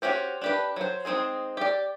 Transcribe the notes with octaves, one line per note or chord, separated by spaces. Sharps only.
C#4 F#4 G4 C5
D4 G4 B4
F#3 C5
G#3 C4 D#4 G#4
G4 D5